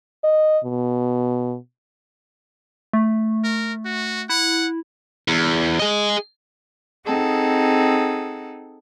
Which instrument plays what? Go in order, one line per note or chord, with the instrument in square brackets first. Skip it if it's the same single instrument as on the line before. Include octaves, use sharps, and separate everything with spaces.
[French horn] D#5
B2
[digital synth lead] A3
[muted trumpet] A#4
F#4
[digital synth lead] E4 [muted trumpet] F#5
[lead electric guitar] E2
G#4 D#5
[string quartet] C4 D#4 G#4 A4 F#5